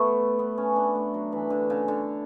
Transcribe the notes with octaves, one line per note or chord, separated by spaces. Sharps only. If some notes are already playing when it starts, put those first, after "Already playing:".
Already playing: A3 B3
B3
C#4
D4
A3
F#3
E3
D3
C#3
D3